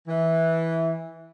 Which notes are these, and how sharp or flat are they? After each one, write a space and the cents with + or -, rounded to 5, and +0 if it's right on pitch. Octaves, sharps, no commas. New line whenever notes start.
E3 -10